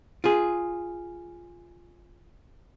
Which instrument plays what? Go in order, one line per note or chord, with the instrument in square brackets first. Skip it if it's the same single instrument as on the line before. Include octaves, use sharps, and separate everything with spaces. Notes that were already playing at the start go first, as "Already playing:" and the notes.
[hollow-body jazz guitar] F4 G#4